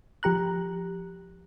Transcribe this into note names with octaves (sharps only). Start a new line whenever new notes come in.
F3 G4 A#5 F#6